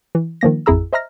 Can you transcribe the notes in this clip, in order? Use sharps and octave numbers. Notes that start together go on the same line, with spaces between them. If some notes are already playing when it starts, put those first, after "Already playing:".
E3
D#3 F3 A#3 A#6
A1 F2 E4 G#4 A#5 E6
C5 D#5 E5 A#5 F6 A#6